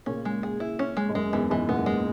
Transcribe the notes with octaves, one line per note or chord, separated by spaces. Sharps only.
A#2 C#3 C#4
G#3
G#4
E4
C#4
G#3
G#2
F#2 G#3
E2 G#2 E3
E2 G#2 E3
F#2 A#2 B3
G#3